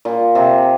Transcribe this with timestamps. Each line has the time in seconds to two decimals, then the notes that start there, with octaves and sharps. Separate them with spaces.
0.05 A#2
0.35 C3